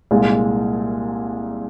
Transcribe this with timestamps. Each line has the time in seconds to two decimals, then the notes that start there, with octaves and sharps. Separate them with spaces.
0.11 C2 A#2 G#3